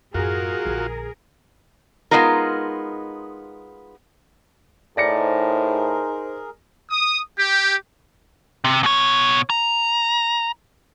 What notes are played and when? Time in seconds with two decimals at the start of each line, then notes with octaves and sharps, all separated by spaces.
0.14 F#2 A2 F4 F#4 G#4 A#4
0.65 A#1 D3
2.11 G#3 A3 B3 D#4 F4 A#4
4.97 A2 D#4 G#4 A#4 C5 D5 A#6 C#7
6.90 D#6
7.39 G4
8.64 C3
8.83 B2 C#5
9.50 A#5